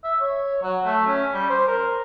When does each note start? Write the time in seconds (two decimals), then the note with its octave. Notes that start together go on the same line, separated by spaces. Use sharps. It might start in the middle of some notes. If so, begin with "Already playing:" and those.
0.04 E5
0.21 C#5
0.63 F#3
0.85 A3
1.07 C#4
1.34 G3
1.50 C5
1.67 A#4